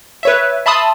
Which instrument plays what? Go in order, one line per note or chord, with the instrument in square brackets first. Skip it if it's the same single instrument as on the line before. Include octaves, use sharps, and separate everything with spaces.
[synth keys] B4 C#5 E5
E5 A5 B5 C6 D#6